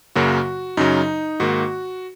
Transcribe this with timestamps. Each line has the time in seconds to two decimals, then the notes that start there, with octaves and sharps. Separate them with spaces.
0.15 F#2 C#3 F#3 A#3 F#4
0.77 F#2 C#3 F#3 D#4
1.40 G#2 D#3 A#3 F#4